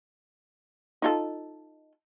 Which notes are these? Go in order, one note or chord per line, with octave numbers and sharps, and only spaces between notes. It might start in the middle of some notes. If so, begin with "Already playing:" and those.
D#4 F4 A4